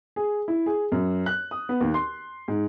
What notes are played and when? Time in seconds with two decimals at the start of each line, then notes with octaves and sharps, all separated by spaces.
0.16 G#4
0.48 E4
0.66 G#4
0.92 F#2
1.26 F#6
1.51 D#6
1.69 B3
1.81 D#2
1.94 C6
2.48 G#2